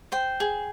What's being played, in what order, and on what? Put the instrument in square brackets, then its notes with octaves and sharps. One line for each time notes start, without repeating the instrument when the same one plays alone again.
[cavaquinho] C5 G5
G#4